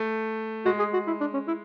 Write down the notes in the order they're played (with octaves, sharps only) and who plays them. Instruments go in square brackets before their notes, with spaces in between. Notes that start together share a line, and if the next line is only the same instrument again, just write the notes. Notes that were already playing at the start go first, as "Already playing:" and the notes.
Already playing: [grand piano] A3
[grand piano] G#3 [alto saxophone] F#4
[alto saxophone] G#4
F#4
E4
D4
C#4
E4